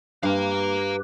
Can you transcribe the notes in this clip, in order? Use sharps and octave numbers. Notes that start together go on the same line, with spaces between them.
G2 G4 B4 F5 A#5